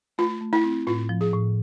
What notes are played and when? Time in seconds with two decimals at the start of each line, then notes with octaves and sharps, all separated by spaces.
0.18 A3 F4
0.41 A3
0.53 E4
0.64 C4
0.87 A2 F4
1.09 F3
1.21 G#4
1.33 A2